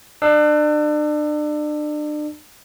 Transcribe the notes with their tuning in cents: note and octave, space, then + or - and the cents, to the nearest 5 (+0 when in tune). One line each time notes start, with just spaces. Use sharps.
D4 +35 E6 +10